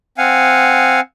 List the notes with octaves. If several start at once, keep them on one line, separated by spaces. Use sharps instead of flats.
C4 F5 F#5 G#5